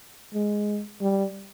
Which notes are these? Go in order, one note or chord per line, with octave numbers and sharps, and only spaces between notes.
G#3
G3